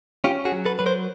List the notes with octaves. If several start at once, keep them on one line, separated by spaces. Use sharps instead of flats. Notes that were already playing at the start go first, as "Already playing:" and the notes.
C#4 F4 G4
F#4 G#4
F#3
A4 B4
F#3 B4
A#4 C5